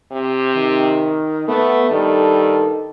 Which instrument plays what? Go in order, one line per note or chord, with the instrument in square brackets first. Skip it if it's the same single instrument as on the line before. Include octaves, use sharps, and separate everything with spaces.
[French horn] C3
[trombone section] D#3
[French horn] A3 [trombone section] B3
[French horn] G2 [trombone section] D#3 A4